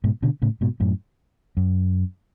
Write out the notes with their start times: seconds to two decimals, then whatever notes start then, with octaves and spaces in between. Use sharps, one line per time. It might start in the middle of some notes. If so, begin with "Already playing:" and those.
0.04 G#2 B2
0.22 B2 D3
0.42 A2 C#3
0.61 G#2 B2
0.80 F#2 A2
1.57 F#2